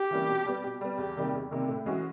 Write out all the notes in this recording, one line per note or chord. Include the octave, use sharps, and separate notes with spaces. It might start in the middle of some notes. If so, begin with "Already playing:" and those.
Already playing: G4
E3 G3 A#3 C#4
B2
G3 B3
B2
G3 B3
E2 G4
C3 D#3 G3 A#3
E2
C3 D#3 G3 A#3
A2
E3 G#3 C#4 F#4